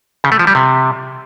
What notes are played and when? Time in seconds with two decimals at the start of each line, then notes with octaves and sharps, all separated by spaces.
0.24 C#3
0.32 A3
0.39 F3
0.47 G3
0.55 C3